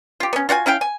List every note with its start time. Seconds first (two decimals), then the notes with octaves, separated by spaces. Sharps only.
0.20 F4 G4
0.33 B3 C#4
0.49 F4 F#4 F#5 G#5
0.66 C#4 E4 F5 G5
0.81 G#5